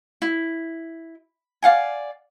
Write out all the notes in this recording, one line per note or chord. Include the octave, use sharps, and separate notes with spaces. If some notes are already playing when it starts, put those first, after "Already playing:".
E4
D5 F5 F#5 G#5